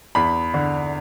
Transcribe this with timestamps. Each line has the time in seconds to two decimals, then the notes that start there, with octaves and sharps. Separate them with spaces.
0.15 E2 B5
0.54 D3